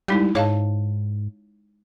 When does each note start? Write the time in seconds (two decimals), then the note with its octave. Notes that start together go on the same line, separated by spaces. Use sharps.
0.08 G3 G#3 D#4 E4
0.35 G#2 C#5 F5 A5